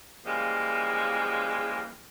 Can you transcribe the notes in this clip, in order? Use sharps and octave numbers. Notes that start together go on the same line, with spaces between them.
C#3 E3 F3 G3 G#3 A#3